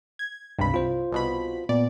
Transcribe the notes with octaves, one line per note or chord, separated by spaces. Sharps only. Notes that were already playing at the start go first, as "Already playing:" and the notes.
G#6
C#2 G2 C3 B5
C2 F4 C5
C2 B2 B5
A#2 B3 D5